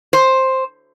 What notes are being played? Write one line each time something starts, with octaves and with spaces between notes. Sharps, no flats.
C5